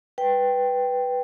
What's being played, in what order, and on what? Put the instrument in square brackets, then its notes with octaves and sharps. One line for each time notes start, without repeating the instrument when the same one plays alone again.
[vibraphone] B4 G5